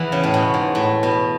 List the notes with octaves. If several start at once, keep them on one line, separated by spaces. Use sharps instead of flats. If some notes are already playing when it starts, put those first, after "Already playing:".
Already playing: E2 E3
C#3
A2
B2
G#2
A2
B2